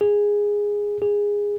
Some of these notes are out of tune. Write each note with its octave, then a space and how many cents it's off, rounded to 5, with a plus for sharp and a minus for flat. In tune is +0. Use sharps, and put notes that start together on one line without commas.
G#4 -10
G#4 -15